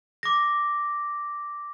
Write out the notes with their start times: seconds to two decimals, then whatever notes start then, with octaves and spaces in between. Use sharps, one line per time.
0.23 D6 A#6